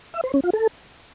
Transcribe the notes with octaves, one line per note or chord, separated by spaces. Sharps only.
E5
C5
C#4
F4
A4